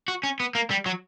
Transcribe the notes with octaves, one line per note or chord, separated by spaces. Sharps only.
F#4
C#4
B3
A#3
G3
F#3